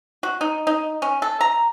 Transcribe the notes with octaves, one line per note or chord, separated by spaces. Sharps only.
F#4
D#4
D#4
C#4
A4
A#5